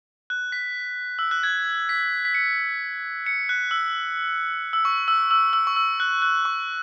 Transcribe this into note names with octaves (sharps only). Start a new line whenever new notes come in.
F#6
B6
E6
F#6
G#6
B6
B6
C#7
C#7
F#6
E6
E6
C#6
E6
E6
E6
C#6
E6
F#6
F#6
C#6